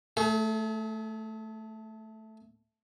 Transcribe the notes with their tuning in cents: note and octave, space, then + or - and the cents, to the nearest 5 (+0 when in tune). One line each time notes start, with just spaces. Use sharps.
A3 +0 G#4 +45